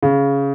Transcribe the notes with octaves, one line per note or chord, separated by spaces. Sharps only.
C#3